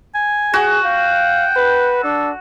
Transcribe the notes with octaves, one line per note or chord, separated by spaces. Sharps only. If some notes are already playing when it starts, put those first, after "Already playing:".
G#5
F#4 G#4
F5 G5
B4
D4 A4